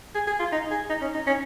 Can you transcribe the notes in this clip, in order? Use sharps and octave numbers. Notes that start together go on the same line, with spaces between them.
G#4
G#4
F4
D#4
G#4
D#4
C#4
D#4
C#4